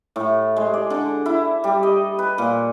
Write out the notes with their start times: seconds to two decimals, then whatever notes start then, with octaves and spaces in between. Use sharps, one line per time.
0.16 A2
0.57 G#3
0.74 D5
0.90 D3
1.26 E4
1.64 G3
1.83 D#5
2.19 B4
2.38 A#2